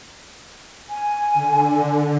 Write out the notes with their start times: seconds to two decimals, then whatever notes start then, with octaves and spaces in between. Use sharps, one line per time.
0.90 G#5
1.34 D3